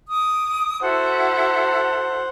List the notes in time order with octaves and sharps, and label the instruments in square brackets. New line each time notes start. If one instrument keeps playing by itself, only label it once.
[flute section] D6 D#6
[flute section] E4 F#4 A4 [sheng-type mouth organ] C5 F#5